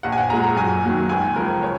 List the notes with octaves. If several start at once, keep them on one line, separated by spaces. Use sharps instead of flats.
A#1 F#5
G#5
F#5
A#2 G#3 A#5
A#5
F#2 G#5
D#3 F#3 A#3
C#2 G#5
C#3 F3 G#3 A#4
C#5